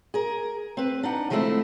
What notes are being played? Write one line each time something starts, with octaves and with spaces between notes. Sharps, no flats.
G#4 A#4
C4 B4
D4 D#4 F#5
D#3 F3 G#3 A3 C4 E4